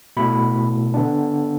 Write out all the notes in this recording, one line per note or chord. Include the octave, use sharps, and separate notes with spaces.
B2 A3 E4 B5
D3 B3 D4